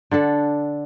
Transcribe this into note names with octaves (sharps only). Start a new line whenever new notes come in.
D3 D4 A4 F#5